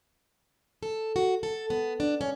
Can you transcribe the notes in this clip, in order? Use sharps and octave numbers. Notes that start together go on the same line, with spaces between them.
A4
F#4
A4
B3
D4
C#4